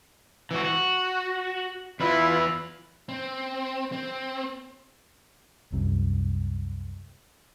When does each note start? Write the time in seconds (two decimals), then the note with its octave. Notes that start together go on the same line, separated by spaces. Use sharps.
0.51 E3 F#4
0.64 F#4
2.00 E2 E4 F4 B4 E5 B5
3.09 C4
3.92 C4
5.72 C2 F#2 C3